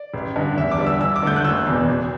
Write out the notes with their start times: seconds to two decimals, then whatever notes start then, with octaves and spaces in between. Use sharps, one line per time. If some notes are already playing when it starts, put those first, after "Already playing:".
Already playing: D5
0.14 A1
0.36 G2 D3
0.57 E2 E5
0.71 D6
0.78 D3 G3
0.86 E6
1.01 G2 E6
1.16 D6
1.22 D3 A3 G6
1.36 F#6
1.45 F#1 E6
1.67 E2 B2
1.89 E1